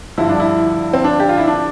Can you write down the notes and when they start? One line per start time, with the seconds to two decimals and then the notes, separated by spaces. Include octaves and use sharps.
0.18 G2 D3 F3 E4
0.29 D4
0.40 E4
0.93 C4
1.04 D4
1.19 G4
1.29 F4
1.38 E4
1.48 D4